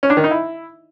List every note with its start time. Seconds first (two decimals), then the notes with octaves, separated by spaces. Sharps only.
0.03 C#4
0.10 D4
0.17 D#3
0.24 D#4
0.31 E4